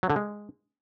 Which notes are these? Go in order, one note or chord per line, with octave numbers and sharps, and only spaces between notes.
F#3
D3
G#3